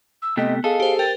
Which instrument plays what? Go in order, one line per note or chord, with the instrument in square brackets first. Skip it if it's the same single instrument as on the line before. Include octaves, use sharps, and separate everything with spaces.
[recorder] E6
[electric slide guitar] C3 A3 G4 [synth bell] B3 [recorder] D#5
[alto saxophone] G#4 [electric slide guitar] A4 [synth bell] D#5 [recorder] F5
[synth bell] G4 C5
[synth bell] A#4 [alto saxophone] G5 [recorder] A6